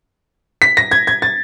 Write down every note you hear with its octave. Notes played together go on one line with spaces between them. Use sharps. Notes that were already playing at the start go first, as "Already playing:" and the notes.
B6
A#6
G#6
G#6
A6